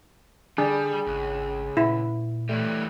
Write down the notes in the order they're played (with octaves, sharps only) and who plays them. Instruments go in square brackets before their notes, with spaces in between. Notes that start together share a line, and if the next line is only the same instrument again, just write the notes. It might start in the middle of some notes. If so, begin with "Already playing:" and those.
[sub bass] D3 [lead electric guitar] G3 [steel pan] D4 [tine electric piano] G#4
[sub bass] G#1 [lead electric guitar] C#2
[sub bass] A#2 [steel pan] E4
[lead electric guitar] E3 G3 [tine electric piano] A3